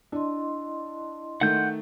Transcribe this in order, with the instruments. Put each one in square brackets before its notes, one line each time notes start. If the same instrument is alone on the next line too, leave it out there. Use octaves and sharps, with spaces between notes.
[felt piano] D4 [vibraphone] E4 D#5 C6
[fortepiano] D#3 A3 [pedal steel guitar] F#5 G6